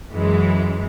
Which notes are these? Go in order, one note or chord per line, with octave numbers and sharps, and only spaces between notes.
F#2 E3 G#3